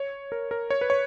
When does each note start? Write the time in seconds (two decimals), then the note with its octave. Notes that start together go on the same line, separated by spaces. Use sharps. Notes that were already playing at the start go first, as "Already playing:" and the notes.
Already playing: C#5
0.32 A#4
0.51 A#4
0.70 C#5
0.81 B4
0.90 C#5